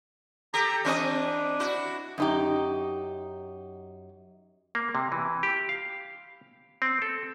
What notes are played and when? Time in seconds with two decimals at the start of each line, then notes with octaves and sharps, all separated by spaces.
0.54 G4 A4 A#5
0.85 E3 C4 D4 D#5
1.60 E4 F#4
2.18 F#2 D#4 G4
4.75 A#3
4.95 C3
5.12 E3
5.43 G4
5.69 F5
6.82 C4
7.02 A4